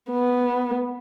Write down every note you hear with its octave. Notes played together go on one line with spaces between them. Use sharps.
B3